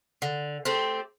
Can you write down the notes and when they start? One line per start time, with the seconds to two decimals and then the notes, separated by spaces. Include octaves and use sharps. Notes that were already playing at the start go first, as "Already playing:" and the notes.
0.22 D3
0.65 A3 C4 G4